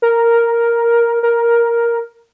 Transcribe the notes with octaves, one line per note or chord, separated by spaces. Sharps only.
A#4
A#4